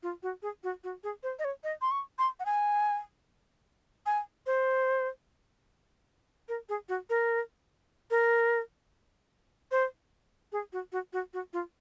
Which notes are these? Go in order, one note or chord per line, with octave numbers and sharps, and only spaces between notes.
F4
F#4
G#4
F#4
F#4
G#4
C5
D#5
C#5
D#5
C6
C#6
C6
F#5
G#5
G#5
C5
A#4
G#4
F#4
A#4
A#4
C5
G#4
F#4
F#4
F#4
F#4
F4